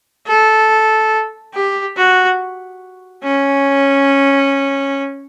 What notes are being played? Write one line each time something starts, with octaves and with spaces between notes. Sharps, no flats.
A4
G4
F#4
C#4